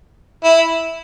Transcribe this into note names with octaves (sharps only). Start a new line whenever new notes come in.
E4